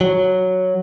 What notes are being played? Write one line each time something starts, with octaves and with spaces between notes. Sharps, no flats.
F#3